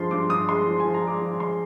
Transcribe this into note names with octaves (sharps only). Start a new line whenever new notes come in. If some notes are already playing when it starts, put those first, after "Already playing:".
Already playing: G2 F3 G#3 C6
G2 D6
G2 D#6
G#3 C6
F3
F3 G#5
A#5
G#3 D6
F3
G#3 C6